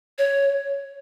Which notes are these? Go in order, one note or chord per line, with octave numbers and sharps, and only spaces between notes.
C#5